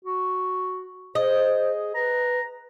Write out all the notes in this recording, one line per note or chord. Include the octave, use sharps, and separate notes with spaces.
F#4
G#4 C5 D#5
B4 A#5